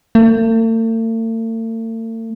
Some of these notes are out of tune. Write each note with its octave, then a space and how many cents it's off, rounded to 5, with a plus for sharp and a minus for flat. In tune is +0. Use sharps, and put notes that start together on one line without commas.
A3 +45